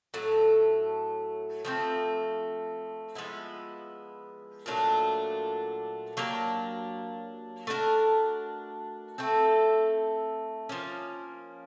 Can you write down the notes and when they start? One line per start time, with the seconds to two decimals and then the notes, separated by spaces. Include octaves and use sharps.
0.14 A2 F#3 A3
1.65 F3 A3 C4
3.15 F3 G#3 B3 E4
4.66 A#2 F#3 A3 D4
6.17 F#3 A#3 D4 G4
7.67 A3 D4 F#4 A#4
9.18 A3 C4 E4 A4
10.69 F3 A#3 C#4